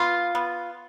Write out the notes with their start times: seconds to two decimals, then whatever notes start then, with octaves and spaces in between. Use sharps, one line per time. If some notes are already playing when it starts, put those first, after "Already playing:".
Already playing: B3 F4
0.35 B3